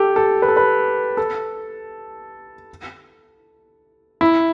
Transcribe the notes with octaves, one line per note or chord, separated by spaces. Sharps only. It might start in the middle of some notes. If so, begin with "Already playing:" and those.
Already playing: G4 A4
A4
B4
A4
B4
A4
E4